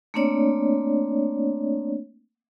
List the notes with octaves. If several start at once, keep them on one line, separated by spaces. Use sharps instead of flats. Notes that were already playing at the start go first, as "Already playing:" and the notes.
A3 A#3 C4 D4 C#5 D5